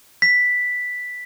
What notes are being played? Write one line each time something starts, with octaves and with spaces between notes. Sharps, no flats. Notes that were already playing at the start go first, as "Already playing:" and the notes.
B6